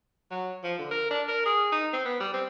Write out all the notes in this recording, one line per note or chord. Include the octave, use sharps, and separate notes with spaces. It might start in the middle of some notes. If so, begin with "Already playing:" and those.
F#3
F3
D3
A#4
D4
A#4
G#4
D#4
C4
B3
G3
C4